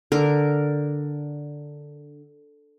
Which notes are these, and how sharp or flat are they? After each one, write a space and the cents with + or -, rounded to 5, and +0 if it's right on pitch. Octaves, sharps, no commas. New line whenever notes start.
D3 +0 A#4 +0